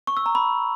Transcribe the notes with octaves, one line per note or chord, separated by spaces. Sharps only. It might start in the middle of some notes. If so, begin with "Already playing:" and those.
C#6
E6
A#5
B5